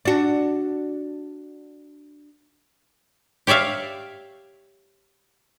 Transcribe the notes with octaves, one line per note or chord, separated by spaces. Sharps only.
D4 F#4
G4 C#5 D5 E5 F5